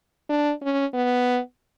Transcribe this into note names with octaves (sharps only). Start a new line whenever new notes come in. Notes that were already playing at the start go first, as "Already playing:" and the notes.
D4
C#4
B3